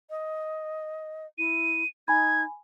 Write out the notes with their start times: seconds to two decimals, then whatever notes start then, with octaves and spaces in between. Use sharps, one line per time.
0.10 D#5
1.38 E4 D#7
2.08 D#4 G#5 B5 G#6